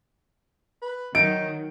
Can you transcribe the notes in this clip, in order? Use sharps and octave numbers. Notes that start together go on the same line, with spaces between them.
B4
D#3 F#3 D#4 D7